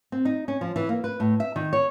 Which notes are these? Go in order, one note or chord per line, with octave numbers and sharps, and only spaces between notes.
C4
D#4
C#4
F3
E3
A#3
B4
A2
E5
D#3
C#5